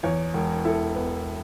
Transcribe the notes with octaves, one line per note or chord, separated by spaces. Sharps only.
E2 C#5
E1
E4 A4
B3